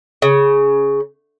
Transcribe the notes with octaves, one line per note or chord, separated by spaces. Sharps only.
C#3